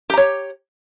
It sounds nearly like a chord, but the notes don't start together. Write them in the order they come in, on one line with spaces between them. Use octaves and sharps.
G4 A#5 C#5